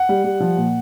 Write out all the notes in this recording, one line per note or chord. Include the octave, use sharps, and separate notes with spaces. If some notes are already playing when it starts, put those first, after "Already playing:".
Already playing: F#5
G3
G3
F3
A#2